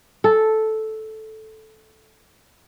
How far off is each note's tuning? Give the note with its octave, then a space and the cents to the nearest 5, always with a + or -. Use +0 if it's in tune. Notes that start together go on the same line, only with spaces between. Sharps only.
A4 -5